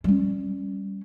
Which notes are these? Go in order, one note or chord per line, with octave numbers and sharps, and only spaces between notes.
G3 C#4